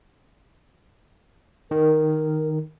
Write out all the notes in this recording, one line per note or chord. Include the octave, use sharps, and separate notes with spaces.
D#3 A#4